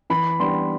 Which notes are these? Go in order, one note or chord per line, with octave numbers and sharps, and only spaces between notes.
E3 B5
G3 B3 D4 C6